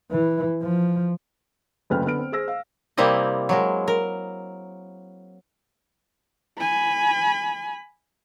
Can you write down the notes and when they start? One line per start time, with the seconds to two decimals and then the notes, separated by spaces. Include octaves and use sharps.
0.11 E3
0.63 F3
1.90 F#1 D2 C#3 B4 G5 F6
2.04 D3 B3 F6 D7
2.18 C4
2.32 G#4 C5 E6 A#6
2.48 F5
2.97 C3 G3 A#3 C4 E4 D#5
3.49 F#3 G#3 A#4
3.88 A#4
6.59 G#5 B5